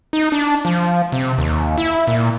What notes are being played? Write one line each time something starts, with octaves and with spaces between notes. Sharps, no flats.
D#4
D4
F3
C3
D#2
E4
A#2